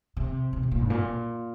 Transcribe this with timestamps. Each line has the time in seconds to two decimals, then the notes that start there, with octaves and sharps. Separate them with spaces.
0.17 C3
0.53 C3
0.63 C3
0.71 A#2
0.81 G2
0.90 A#2